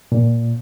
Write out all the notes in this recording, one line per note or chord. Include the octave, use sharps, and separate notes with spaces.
A#2